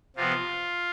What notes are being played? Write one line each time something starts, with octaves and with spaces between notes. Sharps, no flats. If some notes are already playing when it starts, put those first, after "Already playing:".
C3 F3 B3 F4